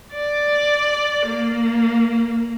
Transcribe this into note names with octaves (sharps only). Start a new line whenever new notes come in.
D5
A#3